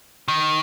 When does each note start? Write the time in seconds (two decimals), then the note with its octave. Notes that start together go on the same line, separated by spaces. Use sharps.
0.28 D#3